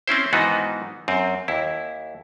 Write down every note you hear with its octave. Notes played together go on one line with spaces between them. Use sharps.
C4 C#4 E4 C5
G#2 D#3 E3 B3 D#4 F#4
F#2 C4
D#2 E4